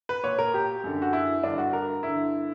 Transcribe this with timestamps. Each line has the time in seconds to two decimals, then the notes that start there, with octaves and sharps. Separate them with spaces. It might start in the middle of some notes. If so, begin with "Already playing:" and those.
0.09 B4
0.24 A#2 C#5
0.39 A#4
0.54 G4
0.84 F#2 D3
1.02 F#4
1.13 E4
1.43 G2 D3 D4
1.58 F#4
1.73 A#4
2.03 G2 D3 E4